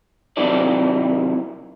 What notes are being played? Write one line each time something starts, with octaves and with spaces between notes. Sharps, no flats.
C3 D#3 F#3 A#3 E4 D5